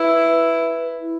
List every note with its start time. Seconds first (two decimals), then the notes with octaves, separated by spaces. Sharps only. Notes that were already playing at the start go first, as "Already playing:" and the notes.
Already playing: E4 B4
1.00 E4